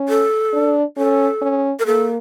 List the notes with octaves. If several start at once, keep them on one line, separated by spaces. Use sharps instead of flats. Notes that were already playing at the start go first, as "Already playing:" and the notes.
Already playing: C#4
A4
D4
C#4 A4
C#4
A#4
A#3 A4